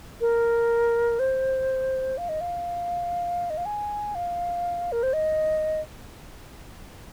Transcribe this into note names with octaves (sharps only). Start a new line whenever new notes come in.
A#4
C5
F5
D#5
F5
D#5
F5
G#5
F5
A#4
C5
D#5